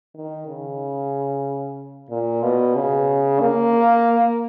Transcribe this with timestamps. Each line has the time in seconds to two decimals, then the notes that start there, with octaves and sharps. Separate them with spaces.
0.15 D#3
0.48 C#3
2.10 A#2
2.43 B2
2.76 C#3
3.40 A#3